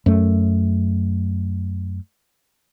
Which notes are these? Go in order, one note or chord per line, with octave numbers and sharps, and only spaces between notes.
F#2 A3